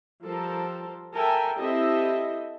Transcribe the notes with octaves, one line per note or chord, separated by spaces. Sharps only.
F3 G3 A4 A#4 C5
A4 A#4 E5 G5 G#5
C4 E4 G4 A4 D#5 E5